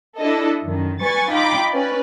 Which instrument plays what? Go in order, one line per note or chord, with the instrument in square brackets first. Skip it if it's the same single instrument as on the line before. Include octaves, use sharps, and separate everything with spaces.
[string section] D4 E4 A4 D#5
F#2 D#3
G3 B4 G#5 C#6 A6
D#4 F4 G5 B5 D6
C#4 B4 D5